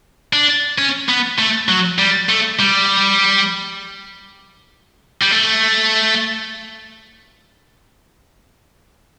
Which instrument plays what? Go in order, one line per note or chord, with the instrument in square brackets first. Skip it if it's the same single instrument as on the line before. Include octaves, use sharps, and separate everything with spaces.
[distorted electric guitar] D4
C#4
B3
A3
F#3
G3
A3
G3
G3
A3